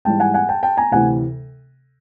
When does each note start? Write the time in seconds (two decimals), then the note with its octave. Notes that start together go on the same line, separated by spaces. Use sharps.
0.05 G#2 E3 G3 G5 A5
0.20 F#5 G#5
0.34 F#5 G#5
0.49 G5 A5
0.63 G5 A5
0.77 G#5 A#5
0.91 D2 C3 E3 F#5 G#5